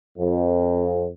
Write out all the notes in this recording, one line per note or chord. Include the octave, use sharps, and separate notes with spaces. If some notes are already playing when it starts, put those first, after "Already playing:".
F2